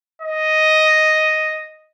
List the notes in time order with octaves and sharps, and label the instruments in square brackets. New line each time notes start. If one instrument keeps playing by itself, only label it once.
[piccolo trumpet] D#5